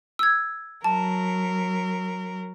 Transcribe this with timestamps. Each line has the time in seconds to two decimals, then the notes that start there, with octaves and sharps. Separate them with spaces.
0.19 E6 G#6
0.84 F#3 A#4 A5